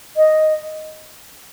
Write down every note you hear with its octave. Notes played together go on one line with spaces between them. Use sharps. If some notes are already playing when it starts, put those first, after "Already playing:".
D#5